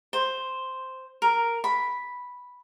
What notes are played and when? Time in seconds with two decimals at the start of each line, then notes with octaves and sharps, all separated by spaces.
0.13 C5
1.22 A#4
1.64 B5